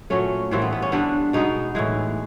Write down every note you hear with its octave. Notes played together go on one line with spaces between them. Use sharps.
A#2 F#3 A3 C#4
A2 E3 G3 A#3 C4
B3
B3
C#4
D3 G3 B3 D4
B2 G#3 B3 D#4
A2 E3 G#3